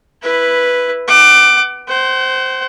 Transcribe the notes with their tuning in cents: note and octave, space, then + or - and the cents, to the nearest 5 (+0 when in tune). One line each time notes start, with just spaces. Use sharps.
E4 +5 B4 +0
F#5 +30 D6 +20
C5 +0 F#5 +45